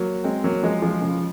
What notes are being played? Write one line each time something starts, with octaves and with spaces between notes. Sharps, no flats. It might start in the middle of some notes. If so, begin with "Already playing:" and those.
Already playing: F#3 A#3
G#3 C4
F#3 A#3
F3 G#3
F3 G#3
C#3 F3